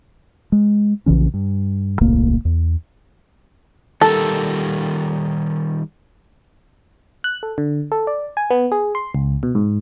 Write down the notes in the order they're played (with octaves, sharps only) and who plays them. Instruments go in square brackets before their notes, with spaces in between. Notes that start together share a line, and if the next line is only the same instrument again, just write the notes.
[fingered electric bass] G#3
A#1 C#3 E3 C#4
G2
D#1 C2 A2 A#3
E2
[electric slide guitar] D#3 G3 A#4 [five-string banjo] A4
[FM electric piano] F#6
A4
D3
A4
D5
G#5
B3
G#4
C6
C#2
B2
G#2